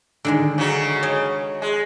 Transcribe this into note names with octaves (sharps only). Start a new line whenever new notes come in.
D3 D#3 G#3
C#3 F#3
C#5 D#5 G#5
G#3